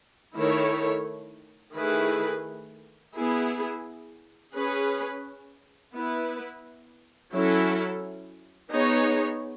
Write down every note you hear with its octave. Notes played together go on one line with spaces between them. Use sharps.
D#3 A3 E4 A4 C#5
D#3 A3 E4 G#4 B4
B3 E4 G#4
C#4 G#4 B4
B3 E4 B4
F#3 C#4 E4 A4
B3 D#4 G#4 C#5